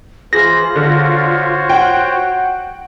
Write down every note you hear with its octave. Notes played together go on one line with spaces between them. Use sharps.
E3 F4 G#4 C5 A#6
D3 F#4 C5 C#5
F#5 G5